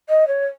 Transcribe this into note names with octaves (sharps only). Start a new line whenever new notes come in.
D#5
C#5